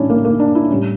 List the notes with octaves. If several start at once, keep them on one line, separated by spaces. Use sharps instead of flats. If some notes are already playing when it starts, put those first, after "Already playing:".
Already playing: A2 E3 G3 C#4 D4 E4
A#3
A#3
D4
E4
A2 G3 C#4